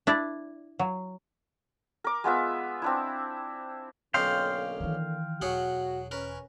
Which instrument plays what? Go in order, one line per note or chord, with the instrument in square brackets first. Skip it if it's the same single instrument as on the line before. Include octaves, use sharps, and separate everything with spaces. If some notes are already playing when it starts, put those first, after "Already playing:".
[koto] D4 E4 D5
F#3
[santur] A#4 D6
G#3 B3 F4 E5
C4 D4 E4
[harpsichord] B1 C#4 D#5 [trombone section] D3 A#3 [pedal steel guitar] F5 G5 C6
[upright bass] D#3 E3
[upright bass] E1 [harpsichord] F#3 G#4 F#5 [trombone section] F#4
[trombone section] C#4 [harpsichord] A#4 B4